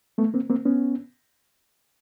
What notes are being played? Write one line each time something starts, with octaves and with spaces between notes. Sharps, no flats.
A3 B3
A#3 C4
A#3 C4
B3 C#4